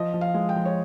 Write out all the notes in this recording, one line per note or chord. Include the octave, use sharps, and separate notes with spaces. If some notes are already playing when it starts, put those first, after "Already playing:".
Already playing: F3 D#5
F3
F5
G#3
G5
F3
C#5